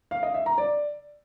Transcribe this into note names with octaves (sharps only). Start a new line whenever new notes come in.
F5
D#5
E5
A#5
D5